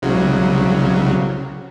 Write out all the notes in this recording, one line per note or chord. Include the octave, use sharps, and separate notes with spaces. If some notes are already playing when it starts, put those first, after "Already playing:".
C2 C#3 F#3